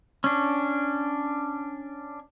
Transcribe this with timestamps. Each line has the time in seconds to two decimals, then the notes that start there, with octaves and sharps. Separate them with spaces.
0.24 C#4 D4